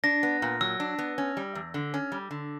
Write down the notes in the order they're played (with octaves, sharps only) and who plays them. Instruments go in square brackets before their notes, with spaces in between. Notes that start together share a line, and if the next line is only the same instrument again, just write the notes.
[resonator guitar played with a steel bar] D4 [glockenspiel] A#6
[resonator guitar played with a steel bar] B3
A#2
[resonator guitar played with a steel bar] F#3 [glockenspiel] E6
[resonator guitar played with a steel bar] D4
B3
C#4
G3
E2
D3
C#4
G3
D3